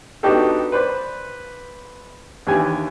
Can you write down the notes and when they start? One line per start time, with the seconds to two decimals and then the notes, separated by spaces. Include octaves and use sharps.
0.23 B3 D4 D#4 F#4 G4 A4
0.72 B4 C5 D5 C6
2.47 D#2 E3 D4 G4 B4 G#5